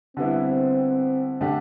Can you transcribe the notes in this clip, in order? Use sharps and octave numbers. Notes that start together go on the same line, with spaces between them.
D3 G3 B3 C4 E4
D3 A3 D4 G4